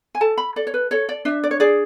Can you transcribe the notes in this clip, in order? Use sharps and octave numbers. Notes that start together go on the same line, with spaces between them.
G#5
A4 A5
B5
A4 D5
C#5
B4
A4 C#5
D5
D4 E5
D5
C#5
G#4 D5